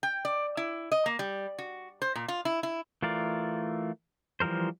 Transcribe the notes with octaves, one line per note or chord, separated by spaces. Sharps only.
G5
D5
E4
D#5
A#3
G3
F#4
C5
A#2
F4
E4
E4
E3 A3 F4 A#4 D5
E3 F3 G3 A#4 C5